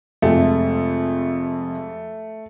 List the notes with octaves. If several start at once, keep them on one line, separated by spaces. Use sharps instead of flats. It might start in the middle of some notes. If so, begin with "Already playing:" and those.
F2 C3 G#3 A3